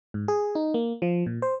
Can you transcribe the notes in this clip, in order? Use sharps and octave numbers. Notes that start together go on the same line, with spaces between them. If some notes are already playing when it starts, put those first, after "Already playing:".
G#2
G#4
D#4
A#3
F3
A#2
C5